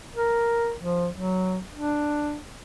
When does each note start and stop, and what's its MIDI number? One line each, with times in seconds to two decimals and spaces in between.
0.16 0.74 70
0.79 1.07 53
1.13 1.59 54
1.74 2.37 62